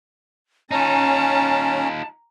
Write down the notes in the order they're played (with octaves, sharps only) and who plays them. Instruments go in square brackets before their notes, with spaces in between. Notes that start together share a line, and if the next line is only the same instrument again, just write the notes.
[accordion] C#4 [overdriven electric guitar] D#4 F4 [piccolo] A5 [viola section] A#5